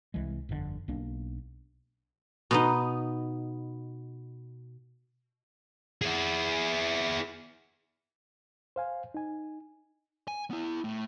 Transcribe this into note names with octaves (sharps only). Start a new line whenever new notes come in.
C2 E3 G#3
G1 F2 G#2 D3
B1 A#3 D4
B2 B3 D#4
E4 G#4
C5 F5 G#5
D#4 G#5
G#5
B3 E4
A2